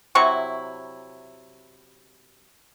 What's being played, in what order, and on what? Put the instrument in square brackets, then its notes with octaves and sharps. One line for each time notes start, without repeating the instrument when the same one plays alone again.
[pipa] C3 F#3 E4 C#6